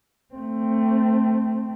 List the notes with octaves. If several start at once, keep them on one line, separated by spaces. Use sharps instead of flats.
A3 C4